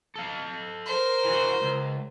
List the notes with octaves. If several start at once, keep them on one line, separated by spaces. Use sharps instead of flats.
A4 F5
A#4 C5
E3 F#4
C#2